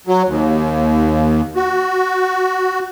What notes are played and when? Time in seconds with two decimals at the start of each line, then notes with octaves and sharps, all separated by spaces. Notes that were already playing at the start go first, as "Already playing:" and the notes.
0.07 F#3
0.27 D#2
1.56 F#4